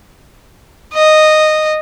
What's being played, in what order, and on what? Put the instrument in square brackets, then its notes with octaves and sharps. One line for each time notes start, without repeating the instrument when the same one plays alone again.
[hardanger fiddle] D#5